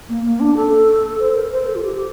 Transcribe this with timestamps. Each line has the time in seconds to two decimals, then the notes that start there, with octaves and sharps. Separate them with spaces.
0.09 A#3
0.25 A#3
0.40 D4
0.57 A4
1.20 C5
1.36 A#4
1.52 C5
1.67 A4
1.75 F4
1.83 G4